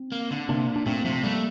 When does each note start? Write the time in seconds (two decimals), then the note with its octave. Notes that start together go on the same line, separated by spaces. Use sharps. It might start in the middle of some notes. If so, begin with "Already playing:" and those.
Already playing: C4
0.12 A#3
0.31 D3
0.49 C3 A#3 D4
0.67 A#2
0.76 D4
0.86 A#2 A3 C4
1.04 C3 F3 A3
1.23 G3 A3 A#3